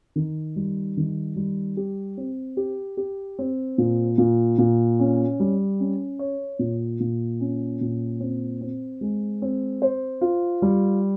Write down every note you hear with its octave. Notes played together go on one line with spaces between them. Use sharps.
D#3
G3
D#3
G3
G4
C4
G4
G4
C4
A#2
A#2
A#2
C#4
G3
C#4
C#5
A#2
A#2
C#4
A#2
C4
C4
G#3
C4
C5
F4
G3